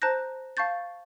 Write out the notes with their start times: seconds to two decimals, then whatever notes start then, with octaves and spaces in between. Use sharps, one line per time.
0.02 C5 A5 A#5 F#6 G6 A#6
0.57 F5 A5 C#6 G6 A6